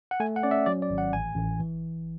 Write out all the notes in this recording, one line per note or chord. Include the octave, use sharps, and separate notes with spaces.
F#5
A3 G#5
F#5
C#4 D5
E5
F#3 D5
D5
G#1
F#5
A1 G#5
A1
E3